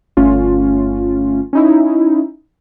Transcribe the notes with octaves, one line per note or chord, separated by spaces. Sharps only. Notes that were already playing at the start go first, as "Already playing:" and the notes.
G1 A3 C#4 F4
C#4 D#4 E4